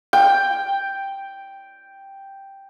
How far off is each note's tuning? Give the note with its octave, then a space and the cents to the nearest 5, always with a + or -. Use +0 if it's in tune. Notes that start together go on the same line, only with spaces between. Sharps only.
G5 +0